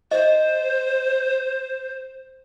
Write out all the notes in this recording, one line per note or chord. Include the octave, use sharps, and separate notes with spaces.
C5 D#5